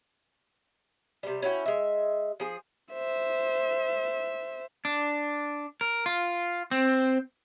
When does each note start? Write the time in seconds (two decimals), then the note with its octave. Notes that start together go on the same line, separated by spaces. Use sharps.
1.23 C3 G3
1.42 C#4 E4 F#4 G5
1.65 G#3 E5
2.40 F3 G#4
2.93 C5 E5
4.85 D4
5.81 A#4
6.06 F4
6.71 C4